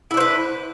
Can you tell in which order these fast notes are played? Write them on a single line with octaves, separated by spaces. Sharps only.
E4 D4 C5 B4